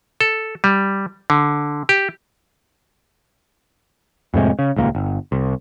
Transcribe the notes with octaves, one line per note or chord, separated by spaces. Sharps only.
A4
G3
D3
G4
F2 A2 C3 G#3
C#3
D#1 C#2 A3 A#3
G1
C2